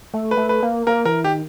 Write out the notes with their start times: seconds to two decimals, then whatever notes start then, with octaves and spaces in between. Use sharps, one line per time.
0.14 A3
0.31 B4
0.37 A3
0.49 B4
0.63 A#3
0.87 A#3 A#4
1.05 E3 A#4
1.24 D#3 G4